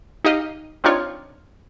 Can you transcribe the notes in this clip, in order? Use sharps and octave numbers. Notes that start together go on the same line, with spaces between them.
D#4 G4 D#5 F5
C4 D4 D#4 F4 C#5